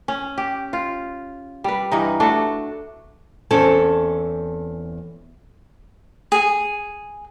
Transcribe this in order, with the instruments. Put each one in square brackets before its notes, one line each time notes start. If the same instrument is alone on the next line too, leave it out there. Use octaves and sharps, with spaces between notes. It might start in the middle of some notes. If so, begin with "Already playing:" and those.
[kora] C#4
G4
F4
G3 B4
G2 E3 D#4
A3 D4 F#4
[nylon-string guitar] E2 C4 C#4 A4
[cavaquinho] G#4